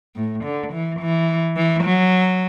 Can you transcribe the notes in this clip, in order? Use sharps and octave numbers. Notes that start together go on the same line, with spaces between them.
A2
D3
E3
E3
E3
F#3